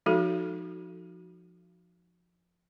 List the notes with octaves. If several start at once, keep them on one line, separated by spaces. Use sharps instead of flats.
F3 G#3 D#4 F#4 A4